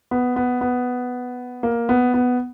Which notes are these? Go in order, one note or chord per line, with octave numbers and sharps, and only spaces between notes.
B3
B3
B3
A#3
B3
B3